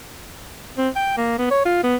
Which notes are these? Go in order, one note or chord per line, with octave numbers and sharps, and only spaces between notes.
C4
G5
A#3
B3
C#5
F4
B3